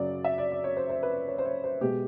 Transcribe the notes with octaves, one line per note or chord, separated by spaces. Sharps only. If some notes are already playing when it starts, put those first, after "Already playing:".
Already playing: F#2 C#3 F#3 D5
E5
D5
D5
C#5
C5
C5
B4
C#5
C5
C#5
C5
B2 G#3 G4